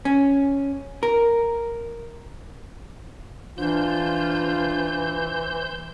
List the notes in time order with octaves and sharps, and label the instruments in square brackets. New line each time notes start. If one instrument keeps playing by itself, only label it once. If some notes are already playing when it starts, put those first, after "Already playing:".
[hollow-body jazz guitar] C#4
A#4
[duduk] E3 [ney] D4 [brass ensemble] F4 [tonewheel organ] C5 G6